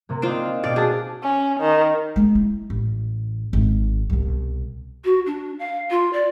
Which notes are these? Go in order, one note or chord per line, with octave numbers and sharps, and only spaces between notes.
C3 A#3
C4 D4 D#4 F4
B2 D5 F5 G5 A6 D7
D4 F#4 G#4 A5
C#4
D#3
G#3 A#3
E4
A1
G#1
C2 B2
F#4
D4
F5
F4
D5